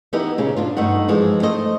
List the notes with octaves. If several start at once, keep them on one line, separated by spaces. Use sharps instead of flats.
E3 B3 D#4 E4 G4 B4
A#2 C#3
B2 D4 F4
G2 A3 D#4 F#5
E3 F3 G#3
A3 A4 C5 D#5